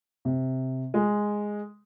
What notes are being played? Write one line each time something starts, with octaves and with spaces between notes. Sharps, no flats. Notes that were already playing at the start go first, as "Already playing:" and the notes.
C3
G#3